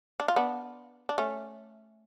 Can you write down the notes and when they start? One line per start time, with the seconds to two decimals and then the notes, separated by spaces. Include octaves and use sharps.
0.20 D4
0.28 F4
0.36 B3 D4
1.09 D4
1.18 A3 C#4